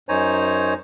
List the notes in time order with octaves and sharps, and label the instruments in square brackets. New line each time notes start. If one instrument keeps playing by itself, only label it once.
[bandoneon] F#2 D#4 C5 C#5 G#5 A#5